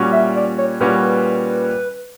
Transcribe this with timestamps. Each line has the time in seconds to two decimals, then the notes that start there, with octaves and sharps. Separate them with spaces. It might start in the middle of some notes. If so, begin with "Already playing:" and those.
Already playing: A#2 G3 C#4 F#4
0.13 E5
0.36 D5
0.58 C#5
0.80 A#2 G3 C#4 F#4 B4